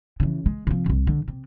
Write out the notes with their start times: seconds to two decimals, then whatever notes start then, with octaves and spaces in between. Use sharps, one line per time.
0.20 C#3 E3
0.46 G#3
0.67 C3 F3
0.86 D1 C2
1.07 D3
1.28 C3